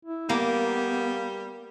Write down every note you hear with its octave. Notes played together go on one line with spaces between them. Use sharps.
E4
G3 A#3 B3